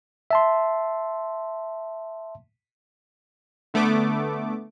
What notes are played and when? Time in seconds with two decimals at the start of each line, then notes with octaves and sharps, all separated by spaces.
0.31 E5 A5 C6
3.74 D3 A3 B3 D6